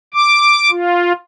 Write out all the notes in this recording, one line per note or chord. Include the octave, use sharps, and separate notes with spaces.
D6
F4